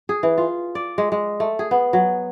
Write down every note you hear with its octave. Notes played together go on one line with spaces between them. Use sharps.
G#4
E3
F4
D5
G#3
G#3
A3
G#4
B3
F#3